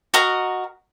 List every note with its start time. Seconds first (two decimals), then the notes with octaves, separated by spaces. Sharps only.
0.14 F#4 A#4 D#5 A#5